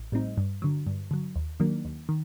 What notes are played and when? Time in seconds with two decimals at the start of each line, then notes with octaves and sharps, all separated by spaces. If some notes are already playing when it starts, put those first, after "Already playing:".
Already playing: A1
0.12 A2 G3 C4 D#4
0.37 G2
0.62 D3 F#3
0.86 G2
1.11 D3 F#3
1.35 D#2
1.60 D#3 F#3 A#3 D4
1.85 D#2
2.09 D#3